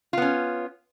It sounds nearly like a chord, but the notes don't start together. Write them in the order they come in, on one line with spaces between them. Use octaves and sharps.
F4 B3 C#4